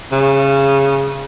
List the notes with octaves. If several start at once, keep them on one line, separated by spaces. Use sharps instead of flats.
C#3